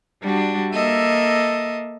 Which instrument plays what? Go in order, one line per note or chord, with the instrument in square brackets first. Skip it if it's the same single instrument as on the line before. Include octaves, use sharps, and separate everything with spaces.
[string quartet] G3 D4 F#4
A#3 A4 D#5 E5